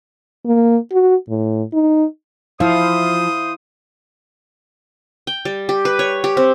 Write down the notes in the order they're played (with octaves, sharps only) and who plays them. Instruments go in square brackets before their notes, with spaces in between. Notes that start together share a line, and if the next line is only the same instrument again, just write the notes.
[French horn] A#3
F#4
A2
D#4
[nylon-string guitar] F3 [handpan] E4 F5 [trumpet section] C5 D#6
[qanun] G5
G3
G4
B4
C#5
G4
C4